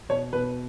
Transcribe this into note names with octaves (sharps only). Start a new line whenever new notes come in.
B2 C#5
B2 B4